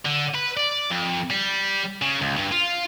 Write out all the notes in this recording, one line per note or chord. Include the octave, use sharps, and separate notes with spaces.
D3
B4
D5
F2
G3
C#3
C#2
G2
F4